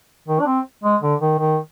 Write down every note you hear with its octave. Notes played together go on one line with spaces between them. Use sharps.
D#3
D4
C4
G#3
D3
D#3
D#3